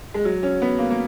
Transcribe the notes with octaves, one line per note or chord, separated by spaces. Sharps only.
G#3
F#3
C#4
B3
A#3
A#3